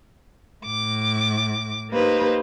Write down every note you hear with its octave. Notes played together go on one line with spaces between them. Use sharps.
A2 D6
A#3 D#4 G4 B4 C5